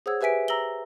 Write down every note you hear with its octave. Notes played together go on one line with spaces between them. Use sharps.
G#4 C5 C#5 F#5 E6 G#6
G4 B4 E5 G#5 B6 D7
A#5 E6 A#6 F#7 G7